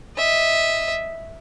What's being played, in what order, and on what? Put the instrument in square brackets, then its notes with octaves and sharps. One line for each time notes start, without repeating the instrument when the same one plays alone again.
[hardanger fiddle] D#5 E5